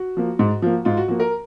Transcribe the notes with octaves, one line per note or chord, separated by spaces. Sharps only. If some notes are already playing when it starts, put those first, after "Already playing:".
Already playing: F#4
F3 A#3
G#2
F3 A#3
G#2 F4
F#4
F3 A#3 F#4
A#4